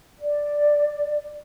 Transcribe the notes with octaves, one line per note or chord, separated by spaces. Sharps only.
D5